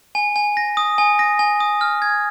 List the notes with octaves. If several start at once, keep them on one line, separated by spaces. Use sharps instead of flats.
G#5
G#5
A#6
D#6
G#5
A#6
G#5
D#6
F6
G#6